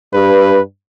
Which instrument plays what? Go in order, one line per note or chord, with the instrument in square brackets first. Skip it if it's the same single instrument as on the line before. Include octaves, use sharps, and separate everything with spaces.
[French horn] G2 [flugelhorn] B4